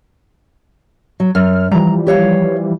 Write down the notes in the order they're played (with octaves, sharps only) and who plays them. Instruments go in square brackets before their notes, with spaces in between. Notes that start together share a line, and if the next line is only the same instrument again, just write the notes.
[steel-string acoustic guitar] F#3
[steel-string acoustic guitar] F#2 [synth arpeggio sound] F6
[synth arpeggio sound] E3 F3 G3 [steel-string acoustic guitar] A#5
[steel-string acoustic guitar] G4 C#5 F5